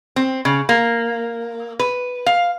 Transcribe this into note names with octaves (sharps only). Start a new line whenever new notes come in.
C4
C#3
A#3
B4
F5